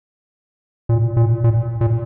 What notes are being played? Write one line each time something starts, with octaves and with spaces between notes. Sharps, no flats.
A#2
A#2
A#2
A#2